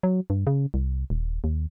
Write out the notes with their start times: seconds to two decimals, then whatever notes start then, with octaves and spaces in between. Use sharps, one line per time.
0.03 F#3
0.30 G2
0.47 C#3
0.74 C2
1.10 D#1
1.44 D#2